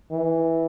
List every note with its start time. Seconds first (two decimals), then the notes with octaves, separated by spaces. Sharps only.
0.11 E3